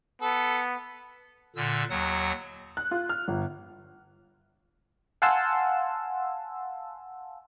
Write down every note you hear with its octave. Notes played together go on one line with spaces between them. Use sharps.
B3 A4
A#2 D3 E6
D#2 F#3 F#5
F#6
F4
F6
G1
F5 F#5 G#5 A5 C6 E6